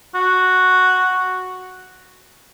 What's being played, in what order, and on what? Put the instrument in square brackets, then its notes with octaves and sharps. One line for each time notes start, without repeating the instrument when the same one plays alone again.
[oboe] F#4